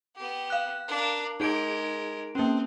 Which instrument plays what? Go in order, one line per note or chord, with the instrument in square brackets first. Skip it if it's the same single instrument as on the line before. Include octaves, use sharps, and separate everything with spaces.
[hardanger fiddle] B3 G4
[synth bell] F5 F#6
[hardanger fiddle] D4 A#4
[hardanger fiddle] G#3 A#4 [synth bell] D#4 G#4 D7
[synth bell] A#3 C#4 [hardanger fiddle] C4